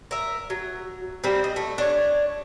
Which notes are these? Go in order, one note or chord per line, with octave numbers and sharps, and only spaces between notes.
A#4 E5
F#3
G3 A#3 C4
D#5
A3
D4 C#5